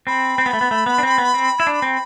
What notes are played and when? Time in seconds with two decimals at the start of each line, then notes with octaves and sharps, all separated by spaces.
0.07 C4 B5
0.38 C4
0.46 B3
0.53 A3
0.61 B3
0.71 A3
0.86 B3
0.98 D4
1.03 C4
1.18 B3
1.34 C4
1.60 E4
1.67 D4
1.82 C4